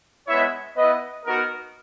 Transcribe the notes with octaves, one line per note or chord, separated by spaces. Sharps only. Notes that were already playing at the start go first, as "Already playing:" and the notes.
G#3 B3 E4 C#5 E5
B3 E4 B4 D#5
B3 D#4 F#4 A#4